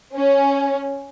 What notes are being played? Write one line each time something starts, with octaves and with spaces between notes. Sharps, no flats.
C#4